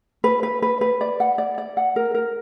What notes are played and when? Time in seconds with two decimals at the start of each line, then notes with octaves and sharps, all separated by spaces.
0.24 B4
0.43 B4
0.62 B4
0.81 B4
1.01 D5
1.20 F#5
1.38 D5
1.58 D5
1.77 F#5
1.96 A#4
2.14 A#4